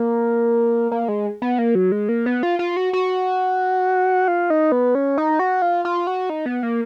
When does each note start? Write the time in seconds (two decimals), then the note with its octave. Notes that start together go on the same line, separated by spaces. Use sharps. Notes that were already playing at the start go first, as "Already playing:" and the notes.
Already playing: A#3
0.92 A#3
1.08 G#3
1.42 B3
1.59 A#3
1.75 F#3
1.92 G#3
2.09 A#3
2.26 B3
2.43 F4
2.59 F4
2.77 F#4
2.93 F#4
4.28 F4
4.50 D#4
4.72 B3
4.95 C#4
5.18 D#4
5.39 F#4
5.62 F4
5.85 F4
6.07 F#4
6.30 D#4
6.46 B3
6.63 A#3